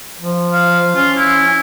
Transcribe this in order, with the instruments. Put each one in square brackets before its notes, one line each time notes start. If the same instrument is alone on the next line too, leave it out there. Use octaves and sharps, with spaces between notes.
[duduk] F3
[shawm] F5
[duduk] C#4 [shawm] F4
[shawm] E4